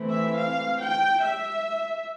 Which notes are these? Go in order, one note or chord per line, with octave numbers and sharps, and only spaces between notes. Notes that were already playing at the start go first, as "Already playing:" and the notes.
Already playing: E3 A3 C4
E5
F5
G5
E5